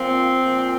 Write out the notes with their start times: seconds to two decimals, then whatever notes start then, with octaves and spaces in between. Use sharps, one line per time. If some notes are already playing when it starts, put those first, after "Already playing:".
Already playing: A#2 F3 C4
0.45 A#2 F3